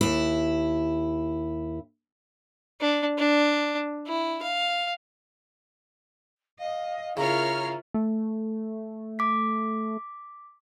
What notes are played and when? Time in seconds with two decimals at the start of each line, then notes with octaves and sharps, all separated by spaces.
0.01 D#2 E4
2.81 D4
3.18 D4
4.07 E4
4.42 F5
6.59 D#5 F5
7.17 C#3 E4 F4 A#4 C#5 A#5 F6
7.94 A3
9.19 D6 B6